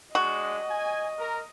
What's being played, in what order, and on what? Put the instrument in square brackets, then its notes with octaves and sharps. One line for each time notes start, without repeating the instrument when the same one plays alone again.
[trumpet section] G#3 D4 [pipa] F#4 [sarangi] D#5
[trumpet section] G#5
A#4